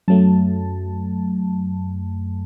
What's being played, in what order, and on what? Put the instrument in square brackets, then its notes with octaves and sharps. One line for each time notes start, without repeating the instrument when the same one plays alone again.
[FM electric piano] F#2 F#3 A3 A5